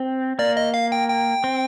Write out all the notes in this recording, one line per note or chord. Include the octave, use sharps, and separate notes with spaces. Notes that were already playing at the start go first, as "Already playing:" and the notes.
Already playing: C4
A#3 D5
D#5
F5
G5
G5
C4